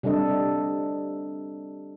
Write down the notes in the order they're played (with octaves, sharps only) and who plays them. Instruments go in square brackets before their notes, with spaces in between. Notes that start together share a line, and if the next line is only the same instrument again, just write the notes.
[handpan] C3 G3 D4 A4 D#5